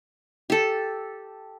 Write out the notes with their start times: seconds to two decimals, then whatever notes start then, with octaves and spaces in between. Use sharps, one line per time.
0.50 G4 A4